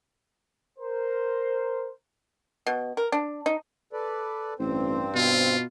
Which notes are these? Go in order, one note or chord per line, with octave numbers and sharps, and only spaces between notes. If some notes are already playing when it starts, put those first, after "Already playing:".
A#4 C5
B2
A#4
D4
D#4
A4 B4 D5
A1 G2 C4 C5
B2 F4